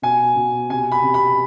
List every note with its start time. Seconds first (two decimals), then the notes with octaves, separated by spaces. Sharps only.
0.02 B2 G#5
0.36 B2
0.69 C3 G#5
0.92 B5
1.03 C3
1.14 B5